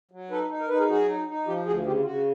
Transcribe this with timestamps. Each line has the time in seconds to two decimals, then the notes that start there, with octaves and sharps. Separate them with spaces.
0.11 F#3
0.30 D#4 A4 B4
0.50 D#4
0.60 A#4
0.69 D#4 B4
0.79 G#4 A#4
0.89 F#3 F#4 G#4
1.08 D#4
1.28 D#4
1.47 F3 F4 G4
1.66 D2 F#4 G#4
1.86 C#3 F4 G4
2.01 F4
2.05 C#3 F#4